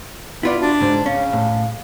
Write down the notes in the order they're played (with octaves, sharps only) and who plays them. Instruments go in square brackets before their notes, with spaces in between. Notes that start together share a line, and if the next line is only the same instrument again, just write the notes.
[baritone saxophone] B3 [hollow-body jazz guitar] E4 F4 D5
[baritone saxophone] D4 [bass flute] F#4
[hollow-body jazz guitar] G#2 C#3 [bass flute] C5
[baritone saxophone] C#3 [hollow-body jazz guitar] C#4 [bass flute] F5
[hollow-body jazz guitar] A2